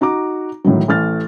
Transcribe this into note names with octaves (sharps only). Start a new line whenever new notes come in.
D#4 F#4 A#5 D6
A2 D#3 E3 F#3
A1 A3 F6 A6